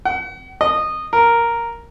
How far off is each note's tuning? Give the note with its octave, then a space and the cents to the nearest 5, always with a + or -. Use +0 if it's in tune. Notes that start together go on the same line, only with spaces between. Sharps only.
F#5 +40
D#5 -15
A#4 +0